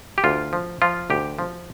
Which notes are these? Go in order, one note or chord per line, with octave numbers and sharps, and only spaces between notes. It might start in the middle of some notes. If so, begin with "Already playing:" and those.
G4
D2 F4
F3
F3 F4
D2 G4
F3